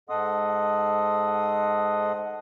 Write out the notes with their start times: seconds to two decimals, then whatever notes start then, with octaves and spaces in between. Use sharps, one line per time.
0.09 G#2 A4 D#5 F#5 C6 D#6